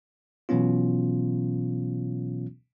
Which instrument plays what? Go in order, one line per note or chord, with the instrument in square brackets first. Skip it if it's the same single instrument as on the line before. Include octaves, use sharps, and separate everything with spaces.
[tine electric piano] B2 E3 F#3 B3 C#4 F4